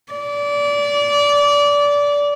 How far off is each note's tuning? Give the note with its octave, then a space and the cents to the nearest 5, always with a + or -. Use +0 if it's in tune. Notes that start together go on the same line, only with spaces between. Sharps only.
D5 -25